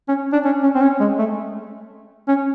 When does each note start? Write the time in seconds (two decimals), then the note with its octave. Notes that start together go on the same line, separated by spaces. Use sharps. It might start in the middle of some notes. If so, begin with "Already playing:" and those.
0.09 C#4
0.33 D4
0.45 C#4
0.63 C#4
0.75 C4
0.82 C#4
1.00 G#3
1.19 A3
2.28 C#4